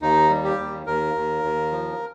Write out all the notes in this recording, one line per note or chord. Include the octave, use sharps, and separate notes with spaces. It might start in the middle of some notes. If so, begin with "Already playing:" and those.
D#2 D#4
G3
G4
D#2
D#2 A#4
D#2
D#2
F3